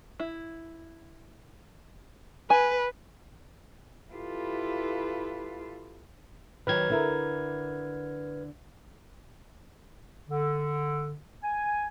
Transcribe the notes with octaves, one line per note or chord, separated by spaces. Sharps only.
E4
B4 G#5
E4 F4 G4 A4 B4
D#3 F#3 B4 G5 F6 G#6
D3 E4 A#4
D3
G#5